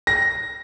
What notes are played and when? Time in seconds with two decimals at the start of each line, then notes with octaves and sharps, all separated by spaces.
0.07 A#6